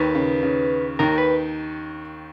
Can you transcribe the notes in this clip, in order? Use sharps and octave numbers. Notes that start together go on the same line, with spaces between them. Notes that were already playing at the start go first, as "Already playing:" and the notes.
Already playing: D#2 D#3 B4
C#3
C#3
D#2 D#3 A#4
B4